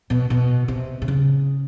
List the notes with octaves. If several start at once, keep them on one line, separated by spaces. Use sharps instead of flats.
B2
B2
C3
C3
C#3